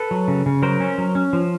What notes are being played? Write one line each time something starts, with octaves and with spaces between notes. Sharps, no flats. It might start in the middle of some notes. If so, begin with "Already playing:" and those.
Already playing: A4 B4
F#3
C#3
C#3
F#3 A#4 C5
C#4
F#3
C#4
F3